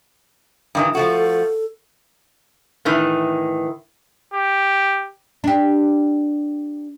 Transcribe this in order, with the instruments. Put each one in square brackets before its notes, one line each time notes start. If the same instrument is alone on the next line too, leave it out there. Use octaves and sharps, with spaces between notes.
[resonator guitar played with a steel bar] G2 D#3 E3
[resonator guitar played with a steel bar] F3 A3 F#4 [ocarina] A4
[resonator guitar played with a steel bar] A2 D#3 E3
[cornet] G4
[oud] D4 G4